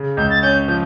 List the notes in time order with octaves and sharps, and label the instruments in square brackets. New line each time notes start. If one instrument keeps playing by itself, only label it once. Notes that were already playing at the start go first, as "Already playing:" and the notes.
Already playing: [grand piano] C#3
[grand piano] C#2 [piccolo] G6
[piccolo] A6
[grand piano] C#4 [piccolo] G6
[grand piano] F3 [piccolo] G6